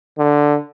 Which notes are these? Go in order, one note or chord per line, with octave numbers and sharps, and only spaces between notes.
D3